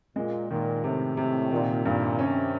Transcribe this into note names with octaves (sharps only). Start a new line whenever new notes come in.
A#2 G#3
A#2 D#3
A2 C3
C3
A#2 D#3
G2 A#2
C3 C#4